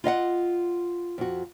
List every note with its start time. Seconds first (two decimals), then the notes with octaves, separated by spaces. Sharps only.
0.04 F4 D#5 F5 F#5
1.18 F2 F#4